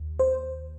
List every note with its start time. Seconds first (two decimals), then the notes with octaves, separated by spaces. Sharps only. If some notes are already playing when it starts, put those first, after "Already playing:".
Already playing: D#2
0.19 C5